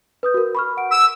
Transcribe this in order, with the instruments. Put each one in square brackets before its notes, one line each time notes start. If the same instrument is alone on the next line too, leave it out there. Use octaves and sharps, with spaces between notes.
[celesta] B4 D#6 G6
F#4 A#4
B5 C#6 F6
F#5 D7
[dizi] E6